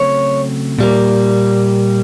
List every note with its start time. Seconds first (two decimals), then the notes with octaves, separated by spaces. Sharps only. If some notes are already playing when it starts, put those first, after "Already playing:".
Already playing: C#3 F#3 A3 C4 C#5
0.79 A#2 G3 A#3